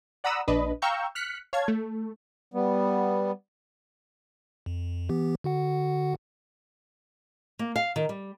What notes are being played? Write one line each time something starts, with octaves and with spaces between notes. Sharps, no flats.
D5 F#5 A#5 B5 D#6 E6
A#1 D4 B4 D#5
F5 G5 A#5 C#6 E6 G6
F6 F#6 B6 C#7
C#5 F5 A5 G#6
A3
G3 B3
F2
E3 B3 G4
D3 F#4 F#5
A#3
F5
D#3
G3